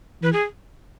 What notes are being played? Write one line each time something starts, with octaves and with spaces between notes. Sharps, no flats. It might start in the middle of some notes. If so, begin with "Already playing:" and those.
E3 B4
G#4